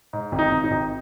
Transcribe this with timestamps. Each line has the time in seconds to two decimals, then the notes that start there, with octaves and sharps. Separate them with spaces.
0.13 G#2
0.32 G#1
0.39 D#4
0.51 G#1
0.64 D#4
0.71 G#1